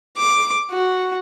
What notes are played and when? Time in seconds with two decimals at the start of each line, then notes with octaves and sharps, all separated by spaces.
0.17 D6
0.71 F#4